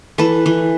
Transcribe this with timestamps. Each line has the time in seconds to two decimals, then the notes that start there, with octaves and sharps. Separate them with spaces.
0.18 E3 A4 B4
0.46 E3